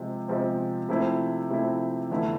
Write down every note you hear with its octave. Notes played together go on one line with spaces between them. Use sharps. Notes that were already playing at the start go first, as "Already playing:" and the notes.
Already playing: C3 F3 G#3 C4
C3 F3 G#3 C4
C3 F3 A3 C4 E4
C3 F3 A3 C4 E4
F1 E2 D3 A3 E4